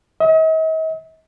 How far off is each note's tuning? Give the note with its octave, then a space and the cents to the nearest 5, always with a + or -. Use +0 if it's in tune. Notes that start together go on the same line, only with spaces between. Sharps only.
D#5 +45